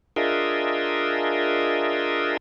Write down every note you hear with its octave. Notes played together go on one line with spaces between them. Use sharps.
D4 F4 G#4 A#4 D#5 E5